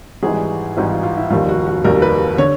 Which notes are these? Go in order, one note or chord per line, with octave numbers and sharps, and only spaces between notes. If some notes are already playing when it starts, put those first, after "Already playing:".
G#1 G#2 E3 G3 G#4
G#1 G#2 E3 G3
F4
F4
E4
F1 D#2 D#3 G3 F4
F#4
F#4
F1 D#2 D#3 G3 A#4
B4
D3 C#5